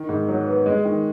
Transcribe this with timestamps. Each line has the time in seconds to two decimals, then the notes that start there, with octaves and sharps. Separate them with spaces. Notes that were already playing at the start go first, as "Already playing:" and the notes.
Already playing: D#3
0.09 G#2
0.29 F#3
0.47 B3
0.66 G#3
0.85 D#3